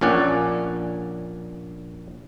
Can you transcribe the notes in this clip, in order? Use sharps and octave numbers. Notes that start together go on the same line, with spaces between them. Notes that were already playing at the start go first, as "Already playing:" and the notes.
A#1 A#2 C#4 D5 F#5